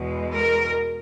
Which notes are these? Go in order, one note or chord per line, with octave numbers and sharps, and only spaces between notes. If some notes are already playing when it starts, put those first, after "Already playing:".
Already playing: E2 B2 G#3
A#4